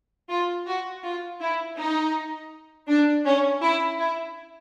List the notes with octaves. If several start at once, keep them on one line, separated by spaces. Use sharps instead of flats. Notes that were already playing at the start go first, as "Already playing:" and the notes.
F4
F#4
F4
E4
D#4
D4
C#4
E4
E4